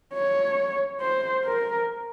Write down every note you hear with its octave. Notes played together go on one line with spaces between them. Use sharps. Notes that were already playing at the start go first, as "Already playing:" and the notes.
C#5
C5
A#4